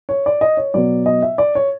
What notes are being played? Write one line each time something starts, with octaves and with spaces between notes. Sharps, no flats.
C#5
D5
D#5
C#5
B2 F#3 D5
D#5
E5
D5
C#5